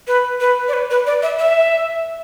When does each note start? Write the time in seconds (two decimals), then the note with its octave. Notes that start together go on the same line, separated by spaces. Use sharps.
0.07 B4
0.41 B4
0.68 D5
0.73 B4
0.91 B4
1.06 D5
1.22 E5
1.39 E5